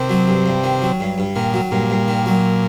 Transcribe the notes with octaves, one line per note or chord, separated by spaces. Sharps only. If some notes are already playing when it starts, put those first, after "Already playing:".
Already playing: C3 D#3
F#3
G2
G2
D#3
F#3
G2
G2
A#2 D#3
F#3
G2 A#2
G2
D#3
F#3